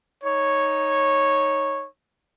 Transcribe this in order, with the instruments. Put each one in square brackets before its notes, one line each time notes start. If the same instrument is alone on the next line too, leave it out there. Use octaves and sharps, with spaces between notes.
[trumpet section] D#4 C#5